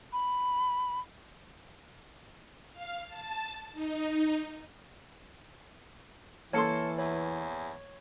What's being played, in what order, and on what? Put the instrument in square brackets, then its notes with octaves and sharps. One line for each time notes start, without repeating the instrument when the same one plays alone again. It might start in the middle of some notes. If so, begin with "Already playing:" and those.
[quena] B5
[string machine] F5
A5
D#4
[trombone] E3 [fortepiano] A#3 A4 C6 [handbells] C#5 A5 C#7
[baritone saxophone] E2 [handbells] C#5